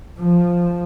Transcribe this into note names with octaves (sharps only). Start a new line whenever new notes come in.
F3